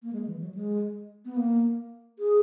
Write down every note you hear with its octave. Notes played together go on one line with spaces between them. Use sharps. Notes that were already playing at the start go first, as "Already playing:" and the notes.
A#3
G#3
E3
F#3
G#3
B3
A#3
G#4